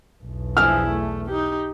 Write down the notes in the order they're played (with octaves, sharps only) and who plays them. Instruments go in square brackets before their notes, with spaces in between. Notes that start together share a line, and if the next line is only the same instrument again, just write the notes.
[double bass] B1 E2
[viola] F3 E4 [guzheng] D4 G#4 E5 [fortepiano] F6
[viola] A3
D#4 G4